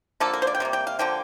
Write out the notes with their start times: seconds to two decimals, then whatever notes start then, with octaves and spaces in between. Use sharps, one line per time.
0.20 D3 F3 A#3 A4
0.33 A#4
0.42 C5
0.47 D5
0.55 G5
0.60 C3 G3 A#3
0.73 G5
0.87 F5
0.99 D3 F3 A#3 G5